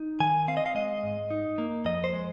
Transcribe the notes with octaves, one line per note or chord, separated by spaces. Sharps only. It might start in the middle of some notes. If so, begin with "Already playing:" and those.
Already playing: D#4
D#3 G#5
C4 F5
D#5
F5
G#3 D#5
G#2
D#4
A#3
F2 D#5
C5
G#3